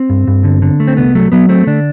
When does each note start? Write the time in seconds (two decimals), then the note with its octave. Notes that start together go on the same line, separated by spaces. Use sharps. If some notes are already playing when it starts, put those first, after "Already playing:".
Already playing: C4
0.10 G2
0.27 G2
0.44 D3
0.62 D3
0.80 A3
0.88 C4
0.97 C2 B3
1.15 F#3 A3
1.32 F#3 B3
1.49 A3 C4
1.67 D3 D4